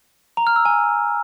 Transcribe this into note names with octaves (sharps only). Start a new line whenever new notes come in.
A#5
F6
E6
G#5